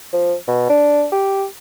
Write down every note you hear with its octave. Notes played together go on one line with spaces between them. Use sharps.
F3
B2
D4
G4